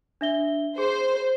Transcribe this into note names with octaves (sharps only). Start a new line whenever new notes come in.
D4 E5 G7
G#4 C5